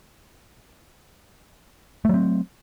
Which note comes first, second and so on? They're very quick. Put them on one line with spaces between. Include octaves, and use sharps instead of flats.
A3 F#3 C4